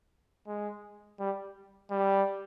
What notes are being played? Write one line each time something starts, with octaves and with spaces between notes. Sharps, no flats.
G#3
G3
G3